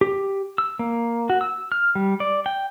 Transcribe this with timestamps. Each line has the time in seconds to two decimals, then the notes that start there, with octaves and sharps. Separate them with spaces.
0.01 G4
0.58 E6
0.79 A#3
1.30 F#4
1.41 E6
1.72 F6
1.95 G3
2.20 D5
2.46 G5